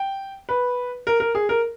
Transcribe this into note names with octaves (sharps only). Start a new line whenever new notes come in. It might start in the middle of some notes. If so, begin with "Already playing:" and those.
Already playing: G5
B4
A#4
A#4
G#4
A#4